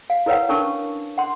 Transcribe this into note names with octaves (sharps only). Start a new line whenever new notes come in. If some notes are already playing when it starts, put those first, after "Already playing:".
F5
E4 A#4 B4 C#5 F5 F#5
C#4 D4 A#4 A5 C#6
F#5 C6